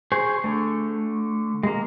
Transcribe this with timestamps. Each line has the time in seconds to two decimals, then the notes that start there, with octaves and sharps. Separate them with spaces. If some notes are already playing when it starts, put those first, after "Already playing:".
0.12 G#4 C5 C#6
0.44 D3 A3
1.63 G#3 A#3